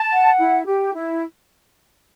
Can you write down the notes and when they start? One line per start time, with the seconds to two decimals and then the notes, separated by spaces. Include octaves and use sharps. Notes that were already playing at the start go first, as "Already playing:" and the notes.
Already playing: A5
0.13 F#5
0.39 E4
0.66 G4
0.93 E4